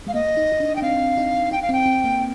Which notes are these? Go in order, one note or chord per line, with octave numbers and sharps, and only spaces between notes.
G#3 F5
A#3 D#5
D#4
D#4
D4
D4 G5
C4 F5
D#4
D#4 G5
F5
C4
G5
C4
A#3